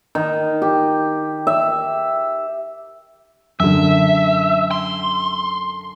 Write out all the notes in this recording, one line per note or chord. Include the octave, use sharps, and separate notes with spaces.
D#3
G4
E5
F#2 D3 E5
C6